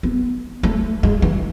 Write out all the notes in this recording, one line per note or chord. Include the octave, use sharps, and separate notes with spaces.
B3
A3
G#3
E3